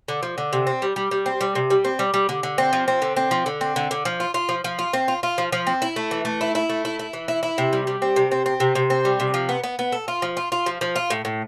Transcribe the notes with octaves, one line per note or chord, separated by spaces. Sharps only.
D3
F3
D3
C3
C4
G3
G3
G3
C4
G3
C3
G3
C4
G3
G3
D3
D3
C4
F3
C4
D3
C4
F3
D3
C4
D3
D3
F3
F4
F4
F3
F3
F4
C4
F4
F4
F3
F3
C4
E4
A3
E3
A3
E4
E4
A3
E4
E4
E3
E4
E4
C3
G3
G3
C4
C3
C4
C4
C3
C3
C4
G3
C3
F3
B3
B3
B3
A4
F4
F3
F4
F4
F3
F3
F4
A2
A2